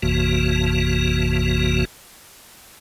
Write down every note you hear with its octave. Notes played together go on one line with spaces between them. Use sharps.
A1 F2 C3 E3 A#3 F#4